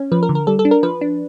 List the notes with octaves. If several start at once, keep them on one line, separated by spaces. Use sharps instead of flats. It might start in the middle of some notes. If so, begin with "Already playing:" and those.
Already playing: C#4
F3 B4
A#4
D3
A#4
G3 A4
A4
D4
A#4
F3 B4
D4